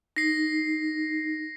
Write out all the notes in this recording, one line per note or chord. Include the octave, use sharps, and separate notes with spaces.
D#4 A#6 C7